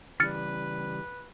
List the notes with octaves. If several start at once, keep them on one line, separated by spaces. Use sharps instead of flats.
C#3 E3 G3 B4 F6 A6 C#7